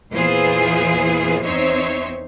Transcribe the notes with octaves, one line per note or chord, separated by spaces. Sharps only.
E2 A#2 E3 F4 G#4 C5
E2 C4 D#4 C5 C#5 E5